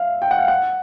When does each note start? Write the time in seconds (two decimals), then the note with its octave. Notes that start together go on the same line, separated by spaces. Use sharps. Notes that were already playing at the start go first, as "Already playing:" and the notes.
Already playing: E5 F5
0.22 G5
0.31 F#5
0.39 F5
0.48 F#5